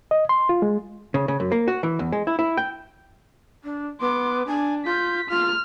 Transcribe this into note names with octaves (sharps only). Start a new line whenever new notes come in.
D#5
C6
F4
G#3
C#3
C#3
F#2
A#3
F#4
E3
E2
G#3
E4
E4
G5
D4
B3 C6 D6
D4 G#5
F4 G6 B6
F4 F6